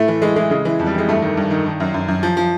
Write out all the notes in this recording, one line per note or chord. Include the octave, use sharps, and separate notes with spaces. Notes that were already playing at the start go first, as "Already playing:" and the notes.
Already playing: A2 A3
E3
E3 G#3
E3 G#3
C#3 G#3
E3
F2
G3
E3 G#3
G2 A3
D#3
G2
D#3
D#3
F#2
F#2
F#2
F3
F3